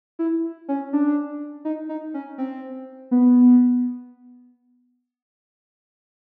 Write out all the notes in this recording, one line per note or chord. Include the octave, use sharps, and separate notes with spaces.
E4
C#4
D4
D#4
D#4
C#4
C4
B3